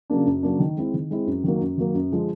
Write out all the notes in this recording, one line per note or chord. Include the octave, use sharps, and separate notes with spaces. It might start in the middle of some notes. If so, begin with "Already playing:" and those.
C#3 F#3 A#3 D4
F#2
C#3 F#3 A#3 D4
D#3
G#3 C4 E4
D#3
G#3 C4 E4
F#2
D#3 F#3 A#3
F#2
D#3 F#3 A#3
F#2
D3 F3 G#3